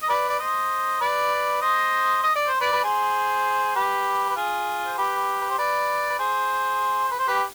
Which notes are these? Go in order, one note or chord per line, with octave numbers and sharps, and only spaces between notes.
D#5
B4 D5
D5
C5 D#5
B4 D5
C5 D#5
D#5
D5
C5
B4 D5
B4
G#4 C5
G4 B4
B4
F4 G#4
C5
G4 B4
B4
C5
B4 D5
B4
G#4 C5
B4
C5
G4 B4